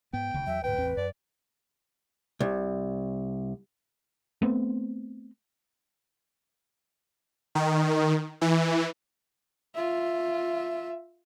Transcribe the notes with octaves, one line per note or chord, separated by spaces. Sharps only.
G#2 B3 G5
E1 D2 C#3
E2 F#3 E5
D2 G#2 B4 G5
A1 E2 C4
F#2 D5
C2
A3 B3 C4
D#3
E3
F4 E5